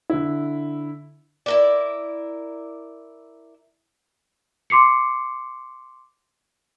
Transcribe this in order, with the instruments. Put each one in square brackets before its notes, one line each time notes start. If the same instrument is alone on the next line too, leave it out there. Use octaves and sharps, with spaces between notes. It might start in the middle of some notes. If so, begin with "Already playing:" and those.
[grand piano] D3 E4
[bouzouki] E4 A#4 D5
[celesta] C6 D6 C7 C#7